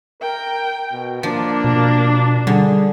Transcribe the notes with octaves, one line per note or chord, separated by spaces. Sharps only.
A#4 G5
B2
F3 A#3 D4
B2
D3 G3 G#4